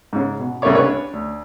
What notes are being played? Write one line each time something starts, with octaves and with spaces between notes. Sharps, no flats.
G#2 C#3
B2
C2 C#3 A3 A#3 C#5 D6
C#4 D4 B4 C#5
D2